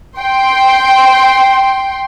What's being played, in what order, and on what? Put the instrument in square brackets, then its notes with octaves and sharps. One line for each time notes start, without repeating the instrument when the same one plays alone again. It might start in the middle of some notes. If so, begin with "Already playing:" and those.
[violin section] G5 C6